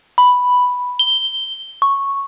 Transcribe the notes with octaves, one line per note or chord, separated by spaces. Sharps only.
B5
G7
C#6